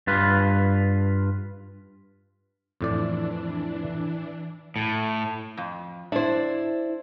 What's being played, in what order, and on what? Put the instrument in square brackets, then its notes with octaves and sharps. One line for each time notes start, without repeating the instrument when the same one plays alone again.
[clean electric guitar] G2 F4 B4
[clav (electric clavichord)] F2 A2 D5 [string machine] E3 D4
[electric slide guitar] A2
[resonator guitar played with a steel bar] F2
[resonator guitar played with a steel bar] D4 C5 [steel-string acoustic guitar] E4 E5